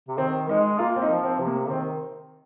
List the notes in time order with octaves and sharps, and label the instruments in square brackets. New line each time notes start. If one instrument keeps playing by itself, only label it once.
[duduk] C3
[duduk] D#3 [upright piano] C4
[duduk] G#3 [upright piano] D#4
[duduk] A#3 [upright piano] F4
[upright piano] C4
D#4
[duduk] F3
[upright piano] C4
[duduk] C3
[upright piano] A#3
[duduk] D#3 [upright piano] C4